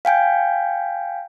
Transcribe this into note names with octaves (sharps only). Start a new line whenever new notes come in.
F5 G5 G#5 G6